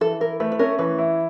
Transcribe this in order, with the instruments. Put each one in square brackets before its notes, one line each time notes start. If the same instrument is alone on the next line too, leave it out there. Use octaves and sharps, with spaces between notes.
[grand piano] E3 [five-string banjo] A4
[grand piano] E4 [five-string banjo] A#4
[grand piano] A3 [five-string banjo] B4
[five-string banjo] B4
[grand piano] C#4 [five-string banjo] A#4
[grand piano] E3 [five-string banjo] B4
[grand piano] E4